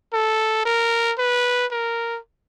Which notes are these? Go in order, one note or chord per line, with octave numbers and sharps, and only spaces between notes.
A4
A#4
B4
A#4